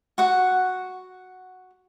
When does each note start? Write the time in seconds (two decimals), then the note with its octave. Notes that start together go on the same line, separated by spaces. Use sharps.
0.18 F#4 F#5